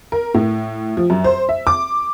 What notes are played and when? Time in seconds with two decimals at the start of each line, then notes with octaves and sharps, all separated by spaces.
0.12 A#4
0.34 A2
0.97 F3
1.10 F#2
1.24 C5
1.49 E5
1.67 D6